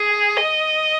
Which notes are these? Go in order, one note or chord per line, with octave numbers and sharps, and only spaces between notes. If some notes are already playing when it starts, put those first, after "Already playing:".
Already playing: G#4
D#5